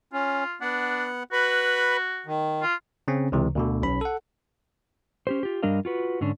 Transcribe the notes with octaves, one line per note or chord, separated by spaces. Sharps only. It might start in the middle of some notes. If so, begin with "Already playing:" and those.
C#4 F4
B3 D4 F#5
F#4 B4 B5
D#3
F4
C#3 C4 C#4
C#2 C3 E3
D2 B2 D3
B1 C#4 B5
A4 F#5
C#4 G4 C5
F4 G4
G2 G3 D4 A#4 D#5 F5
F4 F#4 B4
G#2 D3 C#4 D4